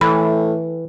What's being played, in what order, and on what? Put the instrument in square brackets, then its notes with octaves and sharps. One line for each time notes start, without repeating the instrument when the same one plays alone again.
[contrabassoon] A2 [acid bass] E3 [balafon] B5